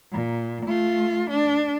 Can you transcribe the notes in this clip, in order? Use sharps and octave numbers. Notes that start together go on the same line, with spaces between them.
A#2
A3 F4
D4